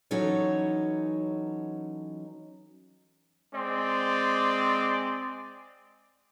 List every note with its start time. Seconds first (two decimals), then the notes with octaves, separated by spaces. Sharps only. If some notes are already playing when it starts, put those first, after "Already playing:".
0.11 E3 F#3 C#4 D#4 A4 C#5
3.54 G#3 C4 D5